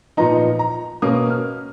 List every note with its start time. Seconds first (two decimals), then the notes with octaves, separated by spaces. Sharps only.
0.17 A#2 F3 B3 D#4 A#5
0.59 A#5
1.02 B2 A#3 C#4 D#6
1.30 F6